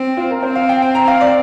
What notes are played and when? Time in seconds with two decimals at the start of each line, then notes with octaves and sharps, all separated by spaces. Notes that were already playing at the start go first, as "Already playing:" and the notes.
Already playing: C4
0.17 F4
0.30 A#4
0.43 C4 C5
0.55 F5
0.69 G5
0.82 G5
0.95 A#5
1.08 F5
1.21 D5